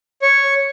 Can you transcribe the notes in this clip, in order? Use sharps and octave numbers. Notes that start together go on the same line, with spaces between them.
C#5